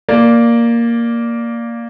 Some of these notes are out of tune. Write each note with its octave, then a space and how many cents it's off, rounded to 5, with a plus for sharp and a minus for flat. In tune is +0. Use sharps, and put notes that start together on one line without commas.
A#3 +0 D5 +0